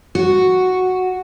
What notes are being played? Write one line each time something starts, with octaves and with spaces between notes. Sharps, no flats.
F#4